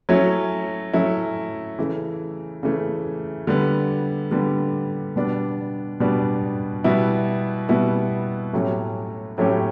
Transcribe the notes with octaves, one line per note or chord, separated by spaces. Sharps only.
F#3 A3 C#4 E4
F#3 A3 C#4 E4
C#3 E3 A3
C#3 E3 A3
D3 G3 B3
D3 G3 B3
B2 G3 B3 D4
B2 G3 B3 D4
B2 G3 B3 E4
B2 G3 B3 E4
A2 F#3 A3 C#4 G4
A2 F#3 A3 C#4 G4